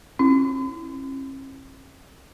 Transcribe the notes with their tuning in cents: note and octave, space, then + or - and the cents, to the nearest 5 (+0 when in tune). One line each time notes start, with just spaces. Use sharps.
C#4 -45 E4 +0